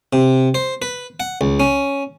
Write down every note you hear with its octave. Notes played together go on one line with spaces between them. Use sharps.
C3
C5
B4
F#5
C#2
C#4